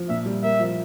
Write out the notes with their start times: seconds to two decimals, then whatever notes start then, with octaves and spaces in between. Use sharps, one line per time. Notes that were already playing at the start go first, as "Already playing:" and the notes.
Already playing: F3
0.09 A#2 E5
0.26 G3
0.43 A#3 E5
0.60 F3